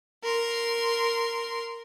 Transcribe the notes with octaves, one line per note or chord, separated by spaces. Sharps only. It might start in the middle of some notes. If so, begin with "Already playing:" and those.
A#4 C6